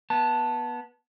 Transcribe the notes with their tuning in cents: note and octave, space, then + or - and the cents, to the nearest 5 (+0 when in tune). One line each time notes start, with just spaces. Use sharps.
B3 -20 A5 +0